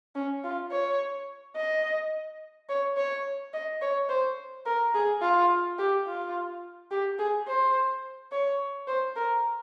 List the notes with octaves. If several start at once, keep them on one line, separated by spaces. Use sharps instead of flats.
C#4
F4
C#5
D#5
C#5
C#5
D#5
C#5
C5
A#4
G#4
F4
G4
F4
G4
G#4
C5
C#5
C5
A#4